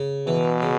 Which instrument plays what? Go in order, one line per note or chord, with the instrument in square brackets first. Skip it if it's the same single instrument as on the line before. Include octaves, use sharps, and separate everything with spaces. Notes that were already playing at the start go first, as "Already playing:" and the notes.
Already playing: [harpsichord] C#3
[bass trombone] B2 [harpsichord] E3
[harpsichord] C#3